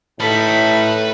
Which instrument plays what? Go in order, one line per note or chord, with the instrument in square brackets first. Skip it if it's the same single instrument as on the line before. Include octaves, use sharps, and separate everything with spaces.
[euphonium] A2 [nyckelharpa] D#4 B5 [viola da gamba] A4 [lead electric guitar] B4 A5